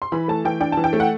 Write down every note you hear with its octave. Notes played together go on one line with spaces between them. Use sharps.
C6
E3 B5
A3 A5
E3 G5
D4 G5
E3 A5
G5
A3
F#5